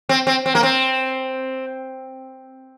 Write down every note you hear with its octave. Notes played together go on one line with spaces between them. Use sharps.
C4
C4
C4
A#3
C4